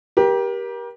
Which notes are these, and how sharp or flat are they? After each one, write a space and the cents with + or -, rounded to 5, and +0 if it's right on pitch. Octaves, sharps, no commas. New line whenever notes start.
G4 +0 A#4 +35